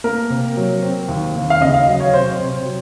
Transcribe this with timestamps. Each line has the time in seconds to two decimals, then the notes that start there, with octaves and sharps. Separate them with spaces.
0.04 A#3 A#4
0.30 C3
0.57 F#3
0.83 C4
1.09 D#2
1.35 D#2
1.50 F5
1.61 C#3 D#5
1.74 F5
1.87 F#3
2.00 C#5
2.13 C3 C5
2.40 C3
2.65 F#3